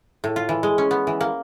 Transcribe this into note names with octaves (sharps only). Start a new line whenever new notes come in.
A2
F4
E3
G#3
C#4
B3
E3
A#3